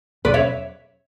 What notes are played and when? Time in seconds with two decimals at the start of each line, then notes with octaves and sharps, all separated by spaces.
0.24 E2 B2 F#3 C#4 B4 D5
0.34 C#5 E5